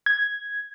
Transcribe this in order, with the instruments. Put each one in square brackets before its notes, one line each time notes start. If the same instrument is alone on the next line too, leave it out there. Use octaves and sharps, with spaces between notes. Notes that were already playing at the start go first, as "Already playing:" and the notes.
[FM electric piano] G#6